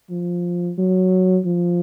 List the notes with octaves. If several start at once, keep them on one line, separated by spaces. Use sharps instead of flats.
F3
F#3
F3